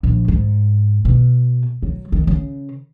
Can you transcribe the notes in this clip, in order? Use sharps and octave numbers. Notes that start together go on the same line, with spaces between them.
A#1
G#2
B2
F#3
D#3
C#3